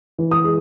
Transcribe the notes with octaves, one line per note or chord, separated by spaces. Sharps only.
E3
D#6
G#3